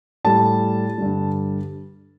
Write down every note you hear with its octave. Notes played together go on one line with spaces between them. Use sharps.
A2 G3 A5
G2 D3 G3